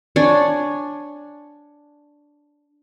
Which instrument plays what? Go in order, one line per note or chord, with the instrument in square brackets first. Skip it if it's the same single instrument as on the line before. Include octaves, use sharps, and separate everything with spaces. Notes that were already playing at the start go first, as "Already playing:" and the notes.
[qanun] D4 C#5 G#5